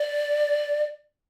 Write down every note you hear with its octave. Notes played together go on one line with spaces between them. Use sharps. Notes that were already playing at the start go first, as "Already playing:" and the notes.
Already playing: D5